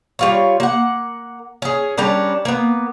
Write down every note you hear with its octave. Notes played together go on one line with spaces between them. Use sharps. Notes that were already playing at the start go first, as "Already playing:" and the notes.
G3 F4 C#5
A#3 F#5
C#4 G#4
G3 C#4 D4 A#4
A#3 B3